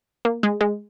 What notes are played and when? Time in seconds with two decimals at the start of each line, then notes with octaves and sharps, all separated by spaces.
0.25 A#3
0.43 G#3
0.61 G#3